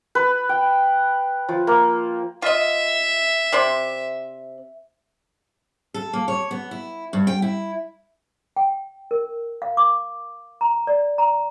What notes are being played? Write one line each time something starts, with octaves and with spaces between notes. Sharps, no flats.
B4
G5
F3
A#3
F4 D#5 E5
C3 C5 D5
A4
A#3
C#5
B3
E4
G2
G5
E4
G5
A#4
F5
D6
A#5
D5
A#5